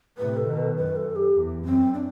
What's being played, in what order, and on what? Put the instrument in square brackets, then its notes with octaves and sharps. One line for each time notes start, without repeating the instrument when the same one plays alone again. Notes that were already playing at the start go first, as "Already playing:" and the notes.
[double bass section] A2 C3 [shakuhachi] B4
[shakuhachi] A4
[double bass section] B2 D#3
[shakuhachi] B4
[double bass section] F#2 [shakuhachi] B4
[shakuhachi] A4
G4
[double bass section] E2
[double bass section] F#2 [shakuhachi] C4
[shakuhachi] D4